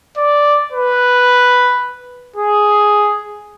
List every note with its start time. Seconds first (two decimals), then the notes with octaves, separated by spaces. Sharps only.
0.17 D5
0.73 B4
2.36 G#4